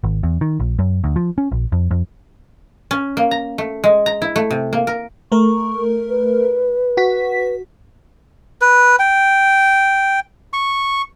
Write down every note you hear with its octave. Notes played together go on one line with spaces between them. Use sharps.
G#1
E2
D#3
A#1
F#2
D2
F3
C#4
A#1
F2
F2
C#4
A#3
A#5
A3
G#3
A#5
E4
A3
C3
A#3
A#4
A3 A#4 C#6
B4
F#4 B6
B4
G5
C#6